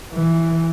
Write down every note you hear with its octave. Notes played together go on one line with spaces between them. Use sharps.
E3